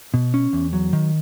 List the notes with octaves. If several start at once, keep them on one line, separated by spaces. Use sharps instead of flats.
B2
C#4
E2
F#3
D#3